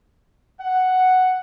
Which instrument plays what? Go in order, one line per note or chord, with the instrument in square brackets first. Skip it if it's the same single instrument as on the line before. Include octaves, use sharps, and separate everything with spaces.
[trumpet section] F#5